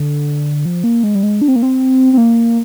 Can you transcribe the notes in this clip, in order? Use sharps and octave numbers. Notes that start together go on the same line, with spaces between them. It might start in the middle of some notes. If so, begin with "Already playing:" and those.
Already playing: D3
F3
A#3
G#3
G3
G#3
D4
C4
A#3
C4
C4
A#3